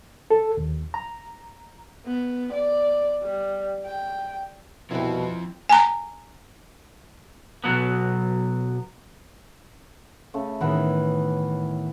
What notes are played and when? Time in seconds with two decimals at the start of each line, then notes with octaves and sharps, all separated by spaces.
0.31 A4
0.57 D#2
0.94 A#5
2.06 B3
2.53 D5
3.22 G3
3.86 G5
4.90 C2 B2 F3 C4 E4 G5
5.69 G#5 A#5
7.64 B1 G#2 F#3 B3
10.34 C#3 A3
10.61 A2 D#3 E3 B3 G#4